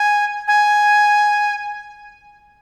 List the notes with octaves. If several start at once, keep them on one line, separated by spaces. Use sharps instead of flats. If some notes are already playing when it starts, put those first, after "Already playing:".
Already playing: G#5
G#5